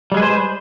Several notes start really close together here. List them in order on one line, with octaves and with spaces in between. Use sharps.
G3 G#3 G#4 B4 C5